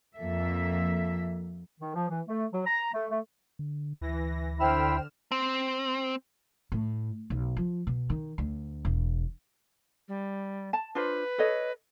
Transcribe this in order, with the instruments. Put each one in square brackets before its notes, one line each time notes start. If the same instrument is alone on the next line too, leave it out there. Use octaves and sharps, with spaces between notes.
[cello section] F2 A#3 A4 E5
[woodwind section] D#3
F3
E3
A3
F#3
A#5
A3
A3
[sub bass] D3
[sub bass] D2 [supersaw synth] E3 A#6
[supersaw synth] D3 F6 E7 [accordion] E4 E5 B5 [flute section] C5 G5
[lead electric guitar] C4
[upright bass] A2
B1
F3
B2
D#3
D2
E1
[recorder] G3
[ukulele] A5
[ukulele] D4 F4 C5 [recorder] B4
[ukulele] A4 C#5 D#5